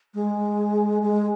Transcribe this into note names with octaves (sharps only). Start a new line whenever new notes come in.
G#3
G#3